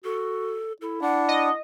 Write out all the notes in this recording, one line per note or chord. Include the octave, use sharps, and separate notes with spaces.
F#4 A4
E4 A4
D4 F#5
D#5